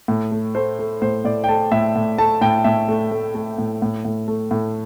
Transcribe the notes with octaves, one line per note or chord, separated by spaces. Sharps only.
A2
A3
A3 C5
A3
A2 C5
A2 D5
G5
A3 A5
A2 E5
A2
A3 A5
A2 G5
A2 E5
A3
A3
A3
A2
A2
A2
A3
A2